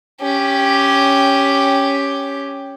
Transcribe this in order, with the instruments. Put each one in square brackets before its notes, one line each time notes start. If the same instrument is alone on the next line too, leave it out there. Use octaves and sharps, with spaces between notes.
[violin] C#4 G4